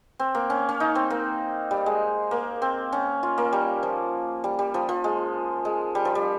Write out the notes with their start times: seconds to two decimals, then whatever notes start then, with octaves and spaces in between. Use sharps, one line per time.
0.20 C4
0.35 A#3
0.50 C#4
0.69 C#4
0.80 D#4
0.95 C4
1.10 A#3
1.71 G3
1.86 G#3
2.31 A#3
2.62 C4
2.93 C#4
3.23 F4
3.38 A#3
3.53 G3
3.83 F3
4.44 G3
4.59 G3
4.74 F3
4.89 F3
5.04 G#3
5.65 G#3
5.95 G3
6.05 F3
6.15 G3